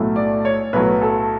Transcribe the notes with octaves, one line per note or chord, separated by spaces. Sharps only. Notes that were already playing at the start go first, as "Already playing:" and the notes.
Already playing: B1 A2 F#3 A3
D5
C#5
B1 A2 F#3 A3 B4
A4